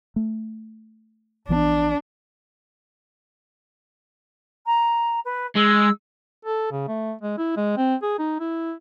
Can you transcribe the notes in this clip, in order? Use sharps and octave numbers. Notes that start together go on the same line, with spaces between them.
A3
A#1 E3 B3 D4
A#5
B4
G#3 E6
A4
C#3
A3
G#3
E4
G#3
C4
G#4
D#4
E4